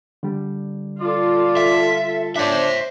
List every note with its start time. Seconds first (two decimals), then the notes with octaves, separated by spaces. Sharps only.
0.23 D3 G3
1.00 F4 A4 D5
1.57 E5
2.36 D4 C5 C#5 E5